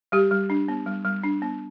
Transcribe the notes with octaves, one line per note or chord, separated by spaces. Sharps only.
G3 G4
G3
D4
B3
G3
G3
D4
B3